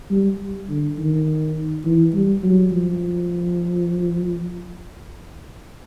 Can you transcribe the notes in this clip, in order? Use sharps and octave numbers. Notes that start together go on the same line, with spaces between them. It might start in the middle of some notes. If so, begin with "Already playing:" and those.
G3
D3
D#3
E3
G3
F#3
F3